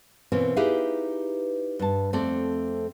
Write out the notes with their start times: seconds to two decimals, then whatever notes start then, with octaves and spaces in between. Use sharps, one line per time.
0.32 B2 E3 A#3 C4 C#4
0.57 D#4 E4 G4 G#4 B4 F5
1.79 G2 A5
2.13 F2 A3 C4 A4 D5